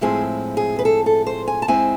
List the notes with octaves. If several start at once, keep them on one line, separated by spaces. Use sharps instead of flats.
A2 F3 G#3 C4 E4 G#4
G#4
B4
A4
A4
C5
G#5
A5
G#2 G#3 C4 E4 G#5